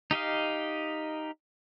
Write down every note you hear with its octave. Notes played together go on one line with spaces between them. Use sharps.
D#4 G4 D#5 F5